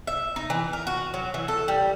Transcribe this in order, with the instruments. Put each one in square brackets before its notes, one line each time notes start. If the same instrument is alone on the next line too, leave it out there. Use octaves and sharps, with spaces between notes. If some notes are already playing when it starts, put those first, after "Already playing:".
[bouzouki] E5
D#4
E3
A#4
F#4
F#3
E3
A4
G3